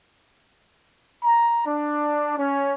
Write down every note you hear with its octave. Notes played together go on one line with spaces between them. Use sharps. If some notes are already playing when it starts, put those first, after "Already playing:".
A#5
D4
C#4